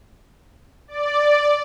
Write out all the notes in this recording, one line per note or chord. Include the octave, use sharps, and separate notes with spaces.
D5